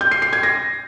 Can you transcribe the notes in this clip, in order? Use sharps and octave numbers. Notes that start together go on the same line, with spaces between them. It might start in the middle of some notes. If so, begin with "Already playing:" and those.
G6
C7
C7
G#6
A#6